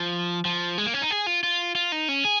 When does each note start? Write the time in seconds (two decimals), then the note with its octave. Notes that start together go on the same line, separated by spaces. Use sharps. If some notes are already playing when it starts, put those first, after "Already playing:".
Already playing: F3
0.45 F3
0.78 G#3
0.86 A#3
0.94 C#4
1.02 D#4
1.11 G#4
1.26 F4
1.43 F4
1.75 F4
1.92 D#4
2.09 C#4
2.25 G#4